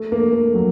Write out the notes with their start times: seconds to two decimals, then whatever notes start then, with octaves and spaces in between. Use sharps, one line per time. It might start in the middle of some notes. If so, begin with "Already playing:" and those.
Already playing: A3
0.12 A#3
0.32 A3
0.54 F#3